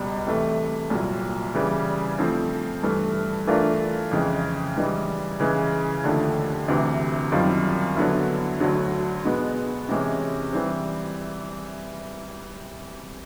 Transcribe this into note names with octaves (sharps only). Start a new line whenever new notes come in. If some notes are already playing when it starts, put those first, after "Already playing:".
Already playing: C#2 B2 G3
C3 E3 A3
C2 A#2 F#3
C#3 E3 G3
F3 A3 C4
G2 E3 A3
E3 A3 D4 F4 A#4
F2 C#3 E3 G#3
G#2 E3 G3
C#3 E3 G#3
D#2 D3 F3 A3
D2 C3 E3
F#2 D#3 G3 C4 F4
D3 F#3 B3 E4
D2 D3 F#3
B2 G#3 B3
C3 E3 G#3 C#4
E3 G3 C4